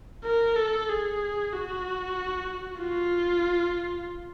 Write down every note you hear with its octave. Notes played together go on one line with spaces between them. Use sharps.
A#4
A4
G#4
F#4
F4